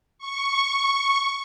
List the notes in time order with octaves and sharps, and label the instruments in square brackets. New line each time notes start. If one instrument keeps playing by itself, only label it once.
[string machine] C#6